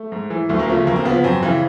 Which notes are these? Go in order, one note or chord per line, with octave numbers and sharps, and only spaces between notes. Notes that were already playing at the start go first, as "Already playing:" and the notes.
Already playing: A3
G#2
E3
D2 A3
A#3
C#3 F3 A3
D2 A#3
C4
C#3 F3 B3
F#2 C4
C#3 E3